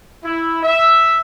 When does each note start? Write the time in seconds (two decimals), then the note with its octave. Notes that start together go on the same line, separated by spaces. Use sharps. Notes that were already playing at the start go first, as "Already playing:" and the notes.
0.23 E4
0.63 E5